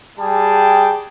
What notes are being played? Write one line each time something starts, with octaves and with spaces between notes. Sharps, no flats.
G3 G#4 G5 A5